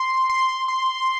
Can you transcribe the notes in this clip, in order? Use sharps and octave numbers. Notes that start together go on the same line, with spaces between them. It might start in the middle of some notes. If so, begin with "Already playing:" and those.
Already playing: C6
C6
C6